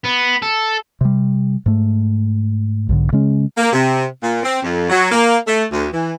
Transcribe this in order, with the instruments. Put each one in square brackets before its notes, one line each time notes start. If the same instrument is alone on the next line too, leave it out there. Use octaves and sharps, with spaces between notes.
[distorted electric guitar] B3
A4
[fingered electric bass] C3 G3
G#2 A3
B1 G#2 D3
C#3 G#3 C#4
[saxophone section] A#3
C3
A#2
C4
F2
F#3
A#3
A3
D2
E3